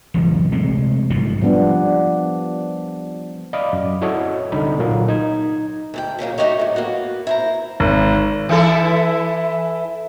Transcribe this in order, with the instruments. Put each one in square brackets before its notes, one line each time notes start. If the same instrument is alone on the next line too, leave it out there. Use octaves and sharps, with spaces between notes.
[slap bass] E1 C#2 F#2 E3
C3 G#3 A3 C4
F#1 G#2 B2 F3
[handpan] F3 G3 B3 D4
[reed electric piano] D5 D#5 F5 B5 D6
F#2
E4 F#4 A4 C#5 D#5
C2 D3 D#4 B5
A#2 F#3 A#3
D#4 A#5 G#6
[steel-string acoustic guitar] D2 G#2 G5
A#2 C#3 F#3 A#3
A3 D#4 F#4 G4 C#5 D#5
A2 F#3
A#3 B3 F#4
E4 C5 A#5
[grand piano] G#1
[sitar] E3 E4 A4